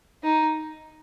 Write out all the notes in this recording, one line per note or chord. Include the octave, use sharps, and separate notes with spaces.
D#4